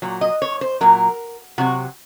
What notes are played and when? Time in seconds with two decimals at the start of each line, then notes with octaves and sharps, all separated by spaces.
0.02 A#2 F#3
0.21 D#5
0.42 C#5
0.61 C5
0.81 A#2 F#3 A#4
1.58 C3 F#3 F#4